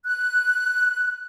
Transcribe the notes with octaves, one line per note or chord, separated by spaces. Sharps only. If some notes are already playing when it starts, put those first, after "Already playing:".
F#6